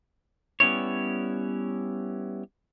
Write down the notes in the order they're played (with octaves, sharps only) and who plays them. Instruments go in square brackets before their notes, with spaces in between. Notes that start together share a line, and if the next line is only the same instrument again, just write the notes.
[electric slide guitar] G3 B3 C#4 E4 C#5